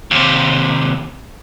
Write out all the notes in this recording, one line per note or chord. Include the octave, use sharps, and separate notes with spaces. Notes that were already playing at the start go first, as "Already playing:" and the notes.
D#2 C3